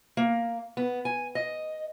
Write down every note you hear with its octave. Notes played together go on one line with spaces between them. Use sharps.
A#3
B3
G#5
D#5